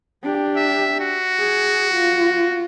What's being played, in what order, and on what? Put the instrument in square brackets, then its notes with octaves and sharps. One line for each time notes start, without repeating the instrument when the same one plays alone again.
[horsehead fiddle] D4 G4
[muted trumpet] E5
F#4
[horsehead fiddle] G#4
F4